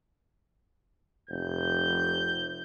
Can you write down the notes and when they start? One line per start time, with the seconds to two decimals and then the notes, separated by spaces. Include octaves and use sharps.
1.29 F1 G6